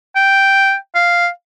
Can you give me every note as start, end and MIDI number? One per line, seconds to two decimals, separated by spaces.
0.16 0.75 79
0.95 1.29 77